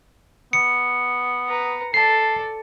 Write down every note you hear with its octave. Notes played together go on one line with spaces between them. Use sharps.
B3 C#7
B4 A#5
A4 D5 A5 C7